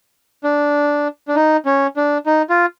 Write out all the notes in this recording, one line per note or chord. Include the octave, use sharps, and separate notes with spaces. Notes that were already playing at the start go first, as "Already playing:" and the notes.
D4
D4
D#4
C#4
D4
D#4
F4